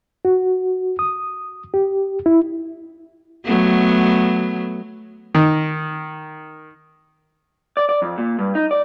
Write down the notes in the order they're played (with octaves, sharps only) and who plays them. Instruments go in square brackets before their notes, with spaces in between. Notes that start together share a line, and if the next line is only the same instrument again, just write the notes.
[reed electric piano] F#4
D#6
G4
E4
[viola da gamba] F#3 A3 B3
[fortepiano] D#3
[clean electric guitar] D5
D5
F2
A#2
G2
D#4
D5